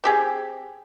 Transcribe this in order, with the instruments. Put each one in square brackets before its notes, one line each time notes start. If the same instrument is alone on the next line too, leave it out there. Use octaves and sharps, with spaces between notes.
[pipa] C4 G4 G#4